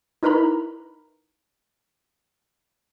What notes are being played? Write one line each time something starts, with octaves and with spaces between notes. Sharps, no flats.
D#4 E4 A#4 B4 A#5 B5